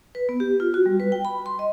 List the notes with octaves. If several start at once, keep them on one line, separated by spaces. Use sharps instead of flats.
B4
B3
G4
F4
F#4
G3
B4
G5
B5
C6
D#5